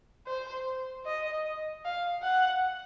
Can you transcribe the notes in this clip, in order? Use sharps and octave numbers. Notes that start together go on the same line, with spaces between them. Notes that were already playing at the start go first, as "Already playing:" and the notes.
C5
D#5
F5
F#5